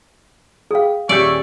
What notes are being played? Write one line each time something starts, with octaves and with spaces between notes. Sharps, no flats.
G#4 F5 G5 D#6
D#1 G4 D5 E5 G#5 C#6 G6